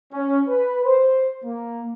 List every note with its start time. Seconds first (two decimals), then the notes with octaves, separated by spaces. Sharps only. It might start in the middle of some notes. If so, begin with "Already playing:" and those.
0.13 C#4
0.48 B4
0.84 C5
1.45 A#3